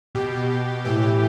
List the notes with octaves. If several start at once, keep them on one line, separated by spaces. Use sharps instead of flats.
B2 G4
B2
A2 E3 G4